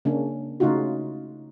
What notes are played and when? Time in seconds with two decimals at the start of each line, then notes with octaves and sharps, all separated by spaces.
0.05 C#3 A#3 C#4 D4
0.60 C#3 A3 D#4 F4 F#4